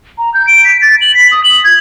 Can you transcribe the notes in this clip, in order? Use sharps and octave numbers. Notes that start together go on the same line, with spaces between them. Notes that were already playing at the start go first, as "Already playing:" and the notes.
A#5
G6
D7
B6
A6
F#7
B6
D#6
F#7
G#6